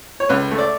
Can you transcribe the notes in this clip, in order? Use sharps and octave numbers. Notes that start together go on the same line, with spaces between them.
C#5
C#2 B4
A3
D5